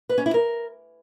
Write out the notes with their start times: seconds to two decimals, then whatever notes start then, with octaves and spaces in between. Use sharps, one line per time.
0.09 B4
0.18 C#4
0.26 E4
0.34 A#4